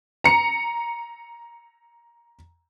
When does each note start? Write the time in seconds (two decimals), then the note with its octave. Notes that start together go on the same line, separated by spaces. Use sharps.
0.24 A#5 C#7